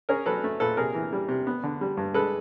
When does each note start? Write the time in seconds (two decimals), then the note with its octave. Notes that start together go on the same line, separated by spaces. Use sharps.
0.09 C#4 G#4 A#4
0.26 F#3 A4 B4
0.44 A3
0.60 A#2 A4 B4
0.77 C3 G#4 A#4
0.94 E3
1.13 G3
1.29 C3
1.47 B3
1.63 D3
1.81 G3
1.97 G2
2.14 G#3 A4 B4